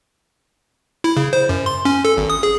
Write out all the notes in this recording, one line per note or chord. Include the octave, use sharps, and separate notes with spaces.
E4
C#3
C5
F#2
C6
C#4
A4
G#1
D#6
G#4